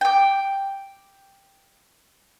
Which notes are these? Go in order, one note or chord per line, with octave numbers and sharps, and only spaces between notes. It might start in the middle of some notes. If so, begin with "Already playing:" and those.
G5 D6